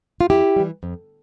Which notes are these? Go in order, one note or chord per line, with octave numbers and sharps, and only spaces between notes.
F4
F2 E4 G4
E3 G3
F2